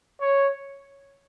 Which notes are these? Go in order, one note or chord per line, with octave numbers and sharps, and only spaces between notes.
C#5